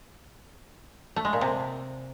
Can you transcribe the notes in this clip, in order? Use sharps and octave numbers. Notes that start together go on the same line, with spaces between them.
A3
G#3
A#2
C3